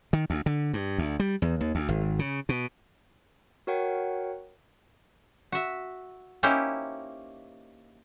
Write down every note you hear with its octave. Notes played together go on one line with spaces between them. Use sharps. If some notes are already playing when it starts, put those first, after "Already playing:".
D#3
D2
D3
G2
D2
G3
E2
D#2
D2
G#1
C#3
B2
F#4 A#4 C#5 F#5 G5
F#4 E5
A#3 C#4 D#4 E4 G4 C5